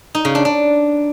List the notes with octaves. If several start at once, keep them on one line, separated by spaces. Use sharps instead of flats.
D#4
C#3
D4
D4